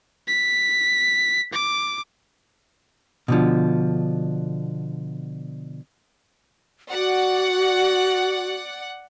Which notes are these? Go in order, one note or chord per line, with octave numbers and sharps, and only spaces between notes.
B6
D6
B2 D3 F3
F#4 D5 F#5